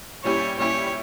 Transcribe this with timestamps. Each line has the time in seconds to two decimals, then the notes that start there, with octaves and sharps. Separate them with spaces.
0.24 A#2 G3 C#4 E4 G4 C#5
0.58 A#2 G3 C#4 E4 G4 C#5